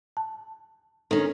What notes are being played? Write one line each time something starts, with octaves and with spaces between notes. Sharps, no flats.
A5
D#3 C#4 D4 A4